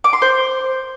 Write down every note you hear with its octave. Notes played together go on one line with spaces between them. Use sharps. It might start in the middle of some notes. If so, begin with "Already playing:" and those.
D6
C6
C5